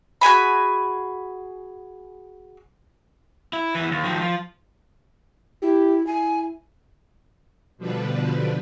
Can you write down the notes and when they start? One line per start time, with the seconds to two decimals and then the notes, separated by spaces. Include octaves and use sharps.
0.21 F#4 G#4 G#5 B5
3.53 E4
3.75 E2 E3
3.91 D#2
4.04 D#3 F3
4.20 F3
5.63 E4 G4
6.07 E4 G#5
7.78 B2 D3 F3 G3 D4 B4